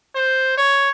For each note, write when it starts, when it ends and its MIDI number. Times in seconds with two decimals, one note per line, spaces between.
0.15 0.57 72
0.58 0.90 73